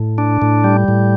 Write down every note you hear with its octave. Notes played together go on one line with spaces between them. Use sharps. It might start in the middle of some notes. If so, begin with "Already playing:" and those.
Already playing: A2
D4
A2
G3
A2